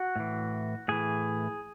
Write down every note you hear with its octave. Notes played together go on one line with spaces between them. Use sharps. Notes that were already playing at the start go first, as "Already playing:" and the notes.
Already playing: F#4
A2 E3
A2 E3 G#4